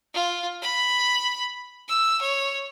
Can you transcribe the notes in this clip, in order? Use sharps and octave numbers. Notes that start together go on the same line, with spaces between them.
F4
B5
E6
C#5